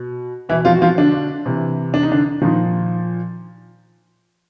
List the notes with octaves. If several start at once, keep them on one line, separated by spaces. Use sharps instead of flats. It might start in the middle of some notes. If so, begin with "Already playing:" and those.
Already playing: B2
B2 E3 E4
F3 F4
F#4
F3 F4
D3 D4
C3 E3
D4
D#4
D3 D4
A#2 D#3 F3 D#4